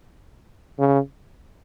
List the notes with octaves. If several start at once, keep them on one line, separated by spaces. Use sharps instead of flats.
C#3